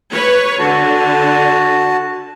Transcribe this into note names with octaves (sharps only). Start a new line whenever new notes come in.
B4 C#5
D3 F#4 A5